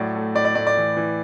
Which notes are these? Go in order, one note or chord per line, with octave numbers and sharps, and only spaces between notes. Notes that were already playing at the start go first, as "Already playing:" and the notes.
Already playing: A2 F#3 D5
A3
A2 D5
D5
A2 D5
D5
E3
E3